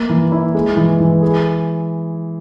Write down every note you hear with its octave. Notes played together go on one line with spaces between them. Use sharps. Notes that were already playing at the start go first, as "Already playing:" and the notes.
Already playing: A#3
E3
E4
G#3
E3
E3
G#4